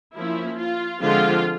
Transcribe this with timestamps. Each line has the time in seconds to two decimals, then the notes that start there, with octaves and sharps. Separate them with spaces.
0.16 F3 A#3 C#4 E4
0.59 F4
1.02 D3 F3 G#3 C4 F4